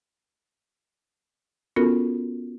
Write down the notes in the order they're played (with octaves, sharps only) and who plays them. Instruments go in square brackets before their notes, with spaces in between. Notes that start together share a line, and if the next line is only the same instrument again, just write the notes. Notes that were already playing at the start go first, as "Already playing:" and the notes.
[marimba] B3 C#4 F4 F#4 A4 A#4